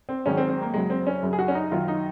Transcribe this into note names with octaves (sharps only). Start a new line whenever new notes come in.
C4
G#2 D#3 F#3 C#4
C4
C4
A#3
F#2 C#3 F#3 G#3
C4
C#4
F#2 C#3 F#3
G#4
F#4
C#4
D#4
F#2 D#3 F#3 F4
D#4